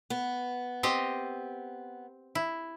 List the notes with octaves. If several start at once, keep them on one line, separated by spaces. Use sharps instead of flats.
B3
C4 G4 D#5
E4